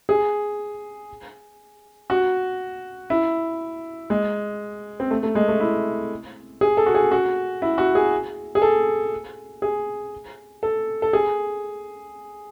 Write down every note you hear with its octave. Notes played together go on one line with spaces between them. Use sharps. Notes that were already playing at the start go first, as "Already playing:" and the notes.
G#4
F#4
E4
G#3
C4
A3
A3
G#3
A3
E4
G#4
A4
F#4
G#4
F#4
E4
F#4
G#4
G#4
A4
G#4
A4
A4
G#4